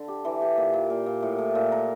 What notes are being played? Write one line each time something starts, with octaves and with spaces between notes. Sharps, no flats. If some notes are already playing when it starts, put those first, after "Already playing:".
Already playing: D3
G4
E3
G4
A#2
A#2
A#2
A#2
A2
A2
A#2
A#4